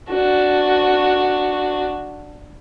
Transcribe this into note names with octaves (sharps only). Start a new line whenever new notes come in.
D4 F#4